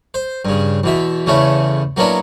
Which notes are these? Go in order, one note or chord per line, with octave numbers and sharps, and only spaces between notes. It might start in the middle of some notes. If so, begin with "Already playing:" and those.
C5
G2 C#3
E2 B2 E5
E2 C#3 A3 C#4 E4
F#3 A#3 B3 C#4 D4 E4